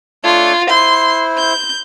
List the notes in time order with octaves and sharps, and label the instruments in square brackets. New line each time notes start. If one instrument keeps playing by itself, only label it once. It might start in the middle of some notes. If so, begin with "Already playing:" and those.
[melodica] A3 D4 C#5 [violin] F4
[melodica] E4 C5 [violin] C6
[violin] G6